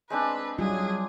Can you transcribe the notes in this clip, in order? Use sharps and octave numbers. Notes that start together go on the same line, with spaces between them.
G#3 C4 D4 B4
F#3 G3 F4 G#4